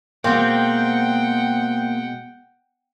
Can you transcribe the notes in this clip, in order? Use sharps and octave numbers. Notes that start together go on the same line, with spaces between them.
B2 G#3 A#3 C4 F#5 G5